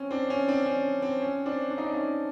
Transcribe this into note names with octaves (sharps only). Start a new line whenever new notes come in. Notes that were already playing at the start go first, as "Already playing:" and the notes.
Already playing: C4 C#4
C4 D4
C#4
C4 D4
C#4
C4
C#4
C4 D4
D4
D#4
C4 D4
C#4 D#4